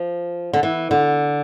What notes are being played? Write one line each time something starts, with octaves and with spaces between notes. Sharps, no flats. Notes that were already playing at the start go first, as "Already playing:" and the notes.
Already playing: F3
D3
E3
D3